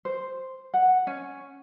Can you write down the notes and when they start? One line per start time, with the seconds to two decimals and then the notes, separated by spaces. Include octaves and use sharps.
0.05 C5
0.74 F#5
1.07 C#4